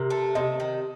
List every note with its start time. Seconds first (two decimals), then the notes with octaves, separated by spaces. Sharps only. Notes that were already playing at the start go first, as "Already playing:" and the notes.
Already playing: C3 A#4
0.10 A3
0.35 C3 D#5
0.60 D#3